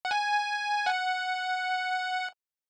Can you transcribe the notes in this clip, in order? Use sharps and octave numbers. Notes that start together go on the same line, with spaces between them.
F#5
G#5
F#5